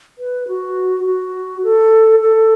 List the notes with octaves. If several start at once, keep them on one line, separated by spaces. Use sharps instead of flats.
B4
F#4
F#4
A4
A4